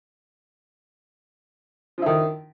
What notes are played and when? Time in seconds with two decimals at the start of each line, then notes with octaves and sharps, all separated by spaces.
1.98 F3
2.02 E4
2.06 D#3